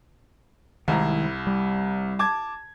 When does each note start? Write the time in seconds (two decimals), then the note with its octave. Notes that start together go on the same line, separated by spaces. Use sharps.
0.88 C2 D#3 G#3 E4 A#5
1.47 G3
2.19 A5 D6 G#6